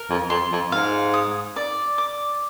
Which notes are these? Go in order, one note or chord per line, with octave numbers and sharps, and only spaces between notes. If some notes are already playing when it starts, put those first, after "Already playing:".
Already playing: A#4
F2
F2 C6
F2
G#2 F5
D#6
D5
D6